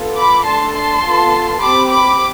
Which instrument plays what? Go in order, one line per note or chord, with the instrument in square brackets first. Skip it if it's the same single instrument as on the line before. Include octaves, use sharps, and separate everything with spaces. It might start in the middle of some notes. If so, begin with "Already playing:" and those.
Already playing: [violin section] B3 F4 A4
B5 D6
A3 D4 A4 A5 C6
A5 C6
B3 F4 A4
C4 G4 B5 D6
B5 D6